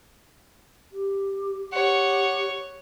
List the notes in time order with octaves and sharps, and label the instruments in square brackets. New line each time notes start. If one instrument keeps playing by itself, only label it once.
[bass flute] G4
[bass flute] G4 [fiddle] C#5 [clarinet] F#5